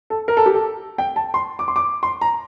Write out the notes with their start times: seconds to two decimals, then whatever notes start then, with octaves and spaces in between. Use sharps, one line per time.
0.10 A4
0.28 A#4
0.37 A4
0.46 G4
0.54 A4
0.98 G5
1.16 A5
1.34 C6
1.59 D6
1.68 C6
1.76 D6
2.03 C6
2.21 A#5